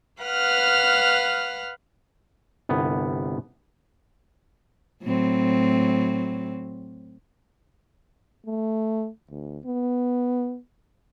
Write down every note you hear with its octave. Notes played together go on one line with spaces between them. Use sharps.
B4 F5 F#5 F6
G1 C2 B3
A2 F#3 C4
A3
D2
B3